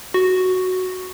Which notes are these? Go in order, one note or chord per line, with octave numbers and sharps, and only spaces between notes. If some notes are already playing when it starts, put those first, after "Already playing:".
F#4